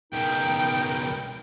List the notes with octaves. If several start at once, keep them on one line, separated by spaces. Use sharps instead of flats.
C#2 B2 D#4 A#4 G5